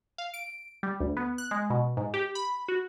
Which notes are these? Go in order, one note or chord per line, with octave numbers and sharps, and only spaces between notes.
F5
D7
G3
D2
B3
F#6
G#3
B2
G#2
G4
B5
F#4